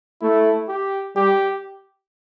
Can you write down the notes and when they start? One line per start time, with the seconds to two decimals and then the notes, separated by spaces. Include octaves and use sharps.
0.21 A3 E4
0.69 G4
1.16 G3 G4